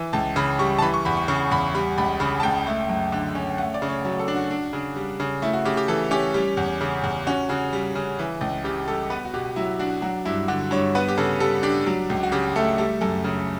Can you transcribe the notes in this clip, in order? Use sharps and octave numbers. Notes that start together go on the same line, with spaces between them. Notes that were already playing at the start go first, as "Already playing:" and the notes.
Already playing: E3
C#2 A5
C#3 B5
G3 C#6
A5
E3 B5
C#6
E2 B5
C#6
C#3 C#6
E2 B5
G3 B5
C#2 B5
C#3 B5
A5
C#2 G5
A3
F#2
D3
C#4
A3 F#5
D5
C#3
C#5
F#3 C#5
A4
D4
F#4
D4
C#3
G3
C#3
A3 E4
F#4
C#3 G4
G4
E3 A4
C#4 G4
G3
E2
C#3
E2
C#4 F#4
C#3 F#4
G3
C#3
E3
C#2
C#3 G4
G3 A4
B3 B4
F#4
B2 G4
F#3 E4
D4 F#4
F#3 F#4
G2 E4
D3 F#4
G2 C#5
B3 B4
G4
C#3 A4
G3 A4
D4 G4
F#3
C#2
F#4
C#3 G4
A3 A4
G3 A4
F#2 A4
C#3